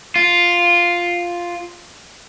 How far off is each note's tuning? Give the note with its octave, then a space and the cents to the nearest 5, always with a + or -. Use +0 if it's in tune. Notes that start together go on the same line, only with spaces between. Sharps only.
F4 +0